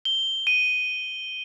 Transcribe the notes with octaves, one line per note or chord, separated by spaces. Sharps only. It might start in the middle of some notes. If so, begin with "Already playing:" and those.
G7
D#7